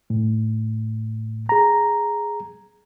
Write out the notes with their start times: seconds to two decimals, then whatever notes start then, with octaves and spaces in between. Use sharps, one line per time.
0.10 A2
1.49 G#4 A#5